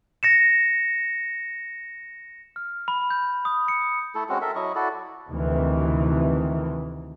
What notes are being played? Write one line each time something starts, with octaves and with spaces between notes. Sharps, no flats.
A#6 C#7 E7
F6
B5
G6
D#6
C#7
A3 E4 A4
G#3 C4 C#4 F#4
A4 A#4 E5
F#3 E4 D#5 C#6
E4 F#4 A4 D5
D2 C3 D#3 E3